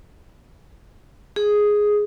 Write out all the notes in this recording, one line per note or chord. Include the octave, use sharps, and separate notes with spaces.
G#4